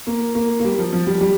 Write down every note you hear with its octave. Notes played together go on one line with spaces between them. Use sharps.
A#3
A#3
A#3
G3
F3
F3
G3
G3